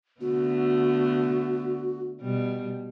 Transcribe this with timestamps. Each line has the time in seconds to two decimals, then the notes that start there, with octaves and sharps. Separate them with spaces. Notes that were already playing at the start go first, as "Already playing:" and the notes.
0.21 D3 A3 B3 F#4
2.21 B2 G3